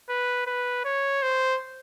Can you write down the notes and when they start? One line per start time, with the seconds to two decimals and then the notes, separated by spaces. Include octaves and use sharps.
0.09 B4
0.46 B4
0.85 C#5
1.22 C5